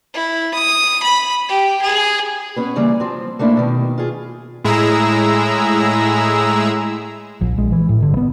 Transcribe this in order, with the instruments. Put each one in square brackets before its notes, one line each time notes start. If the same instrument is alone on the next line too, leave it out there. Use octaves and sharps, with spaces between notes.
[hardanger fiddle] E4
D#6
B5
G4
G#4
[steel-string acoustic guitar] B3 C#4 B4
C#3 E3 G3 A#3
F3 C4
A3 A#3 D4 E4
B2 D#3
F4 G#4
[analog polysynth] A2 G#3 E4 G#4 A#5 E6
[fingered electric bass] A#1
A#1 G#3
E3
A2
G1 D3
B3